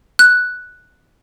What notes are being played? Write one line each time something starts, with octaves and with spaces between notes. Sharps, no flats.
F#6